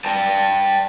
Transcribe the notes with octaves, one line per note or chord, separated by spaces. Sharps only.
D5 G5 A5